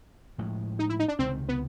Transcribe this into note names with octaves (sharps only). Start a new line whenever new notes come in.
A2 F3 G#3
D#4
E4
D#4
D4
C#2 C3 D#3 C4
B3